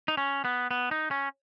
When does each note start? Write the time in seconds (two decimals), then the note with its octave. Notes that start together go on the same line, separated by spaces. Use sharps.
0.08 D#4
0.17 C#4
0.45 B3
0.71 B3
0.91 D#4
1.11 C#4